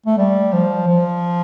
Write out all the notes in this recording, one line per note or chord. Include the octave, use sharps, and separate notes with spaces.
A3
G3
F3
F3